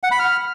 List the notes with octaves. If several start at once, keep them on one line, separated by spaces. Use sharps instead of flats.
F#5
B5
F6